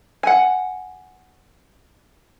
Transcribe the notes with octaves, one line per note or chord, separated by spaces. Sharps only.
F#5 G#5